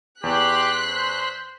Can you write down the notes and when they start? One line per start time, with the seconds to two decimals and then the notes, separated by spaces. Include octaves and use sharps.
0.23 E2 G4 C6 F#6 B6
0.91 C5